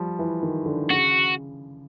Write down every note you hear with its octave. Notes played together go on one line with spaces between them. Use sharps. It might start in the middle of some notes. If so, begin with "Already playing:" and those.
Already playing: F3 G3
E3
D#3
D3
C#3 F#4